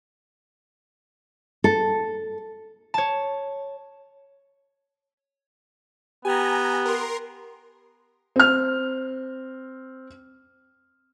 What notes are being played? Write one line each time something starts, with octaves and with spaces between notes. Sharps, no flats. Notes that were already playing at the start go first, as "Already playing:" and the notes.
A4
C#5 A5
B3 G4 G#5 A#5
A#4 C6
C4 F6